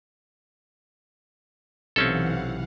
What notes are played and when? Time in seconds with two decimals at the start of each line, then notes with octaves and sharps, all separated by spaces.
1.96 B1 C3 E3 C4 C#4 A4 F5 F#5